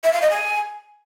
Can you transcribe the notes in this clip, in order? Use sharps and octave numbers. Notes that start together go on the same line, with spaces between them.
E5
F5
D#5
G#5